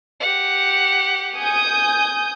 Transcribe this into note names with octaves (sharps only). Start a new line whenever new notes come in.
G4 F#5
G#5 D#6 G6